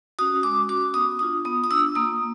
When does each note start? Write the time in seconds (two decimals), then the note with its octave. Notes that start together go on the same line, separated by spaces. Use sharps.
0.19 C#4 F#4 D#6
0.43 G#3 D6
0.69 C#4 F#4 D6
0.94 B3 D#6
1.19 D4 F4 D#6
1.45 B3 D#6
1.64 D#6
1.71 D4 F4 E6
1.95 A#3 D#6